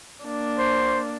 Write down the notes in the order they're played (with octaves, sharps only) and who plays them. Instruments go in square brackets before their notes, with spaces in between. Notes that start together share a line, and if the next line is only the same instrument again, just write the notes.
[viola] A#3 D4
[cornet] C5